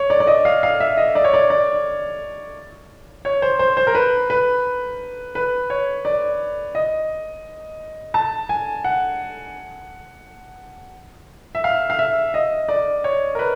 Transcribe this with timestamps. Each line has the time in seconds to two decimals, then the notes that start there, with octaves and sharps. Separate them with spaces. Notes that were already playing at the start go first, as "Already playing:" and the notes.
Already playing: C#5
0.10 D5
0.20 D5
0.27 D#5
0.45 F5
0.63 F5
0.80 E5
0.97 D#5
1.15 D5
1.24 C#5
1.34 D5
1.50 D5
3.25 C#5
3.42 C5
3.59 C5
3.77 C5
3.87 A#4
3.95 B4
4.30 B4
5.35 B4
5.70 C#5
6.05 D5
6.75 D#5
8.14 A5
8.49 G#5
8.84 F#5
11.55 E5
11.64 F5
11.90 F5
11.99 E5
12.34 D#5
12.69 D5
13.04 C#5
13.35 A#4
13.39 B4